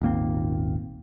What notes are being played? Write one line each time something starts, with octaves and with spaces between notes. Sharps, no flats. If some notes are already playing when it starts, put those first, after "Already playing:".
D#1 G#1 A#3 C4